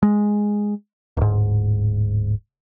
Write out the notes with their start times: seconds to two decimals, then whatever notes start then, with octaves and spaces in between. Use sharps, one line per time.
0.03 G#3
1.17 D1 G#2